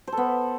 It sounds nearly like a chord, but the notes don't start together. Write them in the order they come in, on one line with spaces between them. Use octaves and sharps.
C5 A4 B3